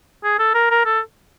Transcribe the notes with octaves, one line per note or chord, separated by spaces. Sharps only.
G#4
A4
A#4
A#4
A4